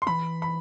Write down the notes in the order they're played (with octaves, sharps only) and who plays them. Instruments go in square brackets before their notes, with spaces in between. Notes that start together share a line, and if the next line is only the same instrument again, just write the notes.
[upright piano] C6
[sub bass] E3 [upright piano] B5
[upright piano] B5